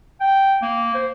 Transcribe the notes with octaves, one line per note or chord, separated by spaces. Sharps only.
G5
A#3
C5